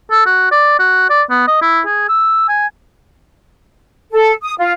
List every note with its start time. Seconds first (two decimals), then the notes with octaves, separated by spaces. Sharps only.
0.11 A4
0.26 F#4
0.51 D5
0.79 F#4
1.10 D5
1.30 B3
1.48 D#5
1.62 E4
1.86 G#4
2.09 E6
2.49 G#5
4.12 A4
4.42 D#6
4.59 F4